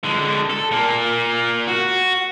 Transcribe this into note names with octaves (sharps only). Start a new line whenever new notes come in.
D3 G#3
A4
A#2 A#3
F#4